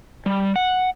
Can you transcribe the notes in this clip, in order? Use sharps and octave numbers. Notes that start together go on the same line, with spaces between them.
G3
F#5